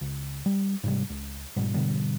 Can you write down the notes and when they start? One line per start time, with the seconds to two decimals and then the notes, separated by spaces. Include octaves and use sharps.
0.01 C#2
0.46 G3
0.84 G#2 C3 G3
1.10 C#2
1.57 G#1 G#2 B2 G3
1.74 G#2 B2 D3 G3